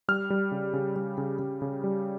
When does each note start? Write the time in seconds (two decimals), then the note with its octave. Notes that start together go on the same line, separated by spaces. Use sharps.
0.08 G3 F6
0.30 G3
0.52 C#3
0.73 C#3
0.96 G3
1.18 C#3
1.39 C#3
1.62 C#3
1.84 G3